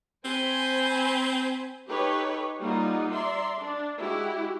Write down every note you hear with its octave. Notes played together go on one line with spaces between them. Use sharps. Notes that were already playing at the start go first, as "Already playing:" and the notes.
C4 C5 G#5 B5
D#4 G4 A4 B4 C#5
G3 A#3 D#4 F4 F#5
D5 E5 A#5 C6
D4
G#3 E4 F#4 G4